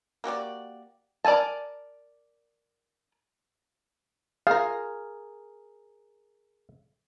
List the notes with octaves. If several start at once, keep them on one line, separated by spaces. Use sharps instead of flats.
A#3 F#4 G4 D5
A#4 D5 F5 G#5 A5
G#4 A#4 F5